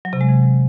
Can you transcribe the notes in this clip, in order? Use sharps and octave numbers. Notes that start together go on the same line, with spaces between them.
F#3
C3
G#3
E3